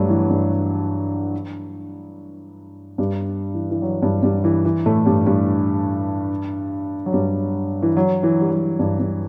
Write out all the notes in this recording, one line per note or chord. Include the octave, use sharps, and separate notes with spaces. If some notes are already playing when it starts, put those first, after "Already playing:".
Already playing: G2 F#3 G3 A3
E3
G2 G3
G2 G3
E3
E3
F#3
G2 G3
G2 G3
E3
E3
A2 A3
G2 G3
G2 G3
F#3
G2 G3
E3
F#3
E3
G3
F#3
G2 G3
G2 G3